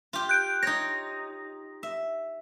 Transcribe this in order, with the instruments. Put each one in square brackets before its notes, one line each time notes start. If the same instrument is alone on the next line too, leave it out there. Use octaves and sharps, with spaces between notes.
[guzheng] F4 G4
[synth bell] F#6 G6 D7
[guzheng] D#4 C#5 [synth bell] A#6
[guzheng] E5